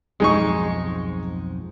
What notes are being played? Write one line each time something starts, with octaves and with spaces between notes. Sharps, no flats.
B1 F2 G#2 G#3 D#4 C#6